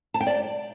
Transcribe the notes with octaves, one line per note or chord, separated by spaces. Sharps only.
A5
G5
D5